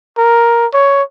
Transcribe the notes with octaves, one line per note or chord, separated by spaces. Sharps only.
A#4
C#5